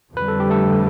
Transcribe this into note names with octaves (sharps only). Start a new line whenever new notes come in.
F2 D3 G3 B4
A4
G4
A3 A4